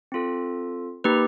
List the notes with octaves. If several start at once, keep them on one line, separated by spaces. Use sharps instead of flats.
C4 F4 A4
A#3 D#4 G4 B4